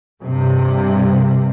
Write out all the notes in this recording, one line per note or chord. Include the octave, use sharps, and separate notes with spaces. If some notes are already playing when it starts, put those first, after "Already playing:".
G2 C3